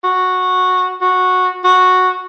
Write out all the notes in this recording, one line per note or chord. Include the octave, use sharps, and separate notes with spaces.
F#4
F#4
F#4